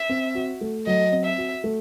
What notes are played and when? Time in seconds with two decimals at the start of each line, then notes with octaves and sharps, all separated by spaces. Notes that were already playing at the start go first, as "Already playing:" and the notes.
Already playing: E5
0.09 C4
0.35 F#4
0.61 A3
0.87 F#3 D#5
1.12 C4
1.25 E5
1.38 F#4
1.64 A3